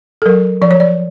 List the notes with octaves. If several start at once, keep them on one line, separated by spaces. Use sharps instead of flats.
A4
F#3 A#4
F3 D5
C#5
D5